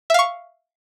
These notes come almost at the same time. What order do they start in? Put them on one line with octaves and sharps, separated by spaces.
E5 F5 C#6